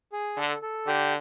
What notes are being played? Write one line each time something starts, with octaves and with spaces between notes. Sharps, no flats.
G#4
D3 A4
A4
D3 G4